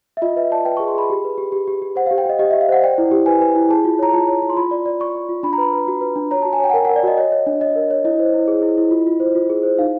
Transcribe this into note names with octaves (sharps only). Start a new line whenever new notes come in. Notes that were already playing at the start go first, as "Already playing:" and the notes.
E5
F4 D#5
B4 E5
D5 A5
B4 G5
G#4 C#6
C6
G#4 B5
G4
B4
G4
G4
G4
G4
C5 F#5
G4 F5
G5
G4 D#5
G4 D#5
G4 E5
F5
C5 F#5
D5 G5
E4
G4
B4 G#5
B4
E4
G#4 A5
F4
C#5 A#5
F4 A5
C#5
F4
C6
F4 B5
D5
D5
D5 C#6
D5
F4
D4 B5
A#5
B4 B5
B4
F#4
B4
D4
C#5 A#5
F#4 A5
G#5
C#5 G5
F#5
A#4 G5
A#4 F#5
D5
F#4 D#5
C#5 D#5
C#5
D4
C#5 D#5
A#4
C#5
E4 D#5
C5
E4
G#4
E4
E4
F4
F4
C5
F4
G#4
C5
D#4 F5